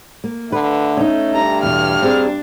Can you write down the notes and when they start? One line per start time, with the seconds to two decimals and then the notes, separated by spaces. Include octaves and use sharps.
0.24 A#3
0.52 D3 A3 B4
0.97 C#4 D#4
1.33 G2 A#5
1.63 E2 B2 F6
2.02 C4 D4 G#4 A#5